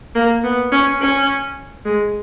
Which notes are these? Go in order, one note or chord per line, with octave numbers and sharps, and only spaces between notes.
A#3
B3
C#4
C#4
G#3